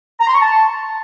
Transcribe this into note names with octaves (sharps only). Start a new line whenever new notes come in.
A#5
C6
C#6
A5